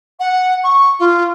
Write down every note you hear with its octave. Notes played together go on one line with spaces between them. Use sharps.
F#5
C#6
F4